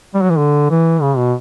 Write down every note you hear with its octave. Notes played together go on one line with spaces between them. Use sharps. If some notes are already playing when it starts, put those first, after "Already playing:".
G3
F#3
E3
D3
E3
C#3
B2